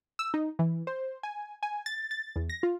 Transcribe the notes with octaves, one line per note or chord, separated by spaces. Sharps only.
E6
D#4
E3
C5
G#5
G#5
A6
A6
E2
A#6
F4